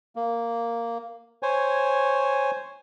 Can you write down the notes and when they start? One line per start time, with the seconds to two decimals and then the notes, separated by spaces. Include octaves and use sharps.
0.16 A#3
1.43 C5 C#5 G#5